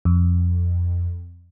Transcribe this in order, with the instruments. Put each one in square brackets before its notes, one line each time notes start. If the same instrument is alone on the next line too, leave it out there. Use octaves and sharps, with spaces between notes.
[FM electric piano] F2